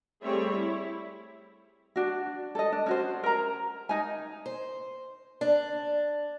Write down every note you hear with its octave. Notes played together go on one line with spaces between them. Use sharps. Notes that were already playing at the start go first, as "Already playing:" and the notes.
G3 A3 C4 G#4 C#5 E5
E4
D4 F#4
A4 D#5
D4
C#4 F#4 C5
A#4 A#5
D#4 G#5
C5
D4